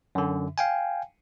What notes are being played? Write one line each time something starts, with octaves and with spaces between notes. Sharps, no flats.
F#2 D3
F5 G5 G#5